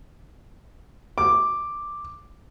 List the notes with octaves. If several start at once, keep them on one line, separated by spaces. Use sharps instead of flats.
D6